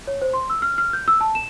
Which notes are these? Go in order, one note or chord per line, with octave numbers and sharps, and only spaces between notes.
C#5
C5
C6
E6
F6
F6
G6
E6
A5
E7